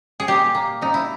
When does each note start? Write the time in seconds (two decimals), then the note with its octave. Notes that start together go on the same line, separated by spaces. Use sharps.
0.20 G#4
0.28 A#2 G4
0.55 A#3
0.81 A#2 D#4
0.94 E4